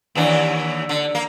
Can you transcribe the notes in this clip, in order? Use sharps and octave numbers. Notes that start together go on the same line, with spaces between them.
D#2 E3 D4
D3
A#3